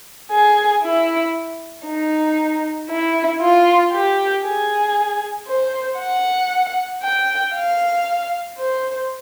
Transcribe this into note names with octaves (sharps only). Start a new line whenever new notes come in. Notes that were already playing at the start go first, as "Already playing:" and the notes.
G#4
E4
D#4
E4
F4
G4
G#4
C5
F#5
G5
F5
C5